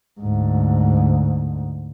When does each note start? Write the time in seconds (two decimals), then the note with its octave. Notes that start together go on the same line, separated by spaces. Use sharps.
0.20 D2 G#2